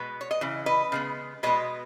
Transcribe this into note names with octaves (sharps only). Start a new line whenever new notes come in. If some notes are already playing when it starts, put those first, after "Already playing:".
Already playing: B2 G#3 B3 B4
C#5
D#5
C#3 E3
B4 D#5
C#3 G#3 B3
B2 G#3 B3 B4 D#5